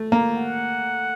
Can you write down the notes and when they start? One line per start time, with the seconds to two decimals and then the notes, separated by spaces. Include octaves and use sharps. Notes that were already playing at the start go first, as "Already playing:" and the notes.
Already playing: A3
0.12 A#3
0.37 F#5